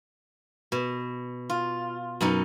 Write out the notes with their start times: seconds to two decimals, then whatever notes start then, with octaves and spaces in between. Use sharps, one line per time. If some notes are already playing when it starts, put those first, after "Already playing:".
0.72 B2
1.50 F4
2.21 F#2 B2 D#4